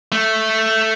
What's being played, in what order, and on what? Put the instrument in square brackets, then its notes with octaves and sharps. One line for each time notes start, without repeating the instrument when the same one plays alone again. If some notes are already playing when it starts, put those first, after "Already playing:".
[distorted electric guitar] A3